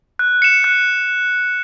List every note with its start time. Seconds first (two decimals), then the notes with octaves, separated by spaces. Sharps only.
0.19 F#6
0.42 C#7 E7
0.64 F#6